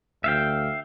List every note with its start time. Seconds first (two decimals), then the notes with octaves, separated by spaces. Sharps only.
0.24 D2 E5 F5 G5